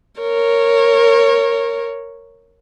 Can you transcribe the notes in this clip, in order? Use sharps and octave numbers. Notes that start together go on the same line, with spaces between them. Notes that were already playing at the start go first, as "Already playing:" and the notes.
A#4 C#5